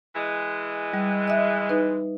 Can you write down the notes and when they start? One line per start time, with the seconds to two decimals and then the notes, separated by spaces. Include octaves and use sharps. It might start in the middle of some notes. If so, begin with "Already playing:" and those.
0.16 E3 G#3
0.94 G3
1.28 D#5 E5
1.69 D#4 B4